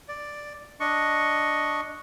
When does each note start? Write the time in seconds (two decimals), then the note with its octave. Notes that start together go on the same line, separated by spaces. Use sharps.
0.08 D5
0.80 D4 D#5 C#6